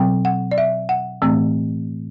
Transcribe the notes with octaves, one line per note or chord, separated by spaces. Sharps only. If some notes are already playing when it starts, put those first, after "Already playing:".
Already playing: B2 F#3 C4 G5
F#5
D5
E5
F#5
A2 E3 A3 C4